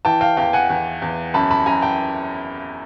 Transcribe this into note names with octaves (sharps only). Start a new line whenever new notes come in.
E3 G5 A5
F5 G5
E2 F5 G5
F#5 G#5
E2
E2
F#2 A5 B5
A5 B5
F#2 G#5 A#5
G5 A5